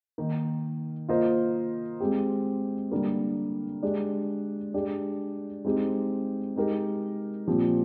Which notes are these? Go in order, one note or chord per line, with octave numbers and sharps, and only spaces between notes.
D#3 A#3 D#4
A#3 F4 C5 D#5
G#3 C4 G4
D3 G3 A#3
G#3 D4 G4
G#3 D4 G4
G#3 C4 D#4 G4
G#3 D#4 G4 A#4
A#2 F3 C4 G4